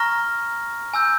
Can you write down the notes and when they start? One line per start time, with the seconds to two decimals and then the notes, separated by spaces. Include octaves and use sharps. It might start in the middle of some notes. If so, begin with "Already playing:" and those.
Already playing: A#5 C#6 F6 A#6
0.94 G#5 E6 G6